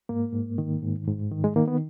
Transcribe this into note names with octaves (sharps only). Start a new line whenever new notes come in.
G#2 A#3
G#2
D#3
G#2
G#2
D#3
G#3
D#3 A#3
B3